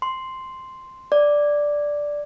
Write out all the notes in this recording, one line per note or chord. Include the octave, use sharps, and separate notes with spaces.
C6
D5